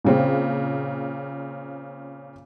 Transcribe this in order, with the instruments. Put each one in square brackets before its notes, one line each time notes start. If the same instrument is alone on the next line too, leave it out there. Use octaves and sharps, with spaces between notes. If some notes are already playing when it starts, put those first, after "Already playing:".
[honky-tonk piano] A#2 C#3 C4